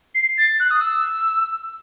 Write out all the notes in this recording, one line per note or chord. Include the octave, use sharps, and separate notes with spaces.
C7
A6
F#6
D#6
E6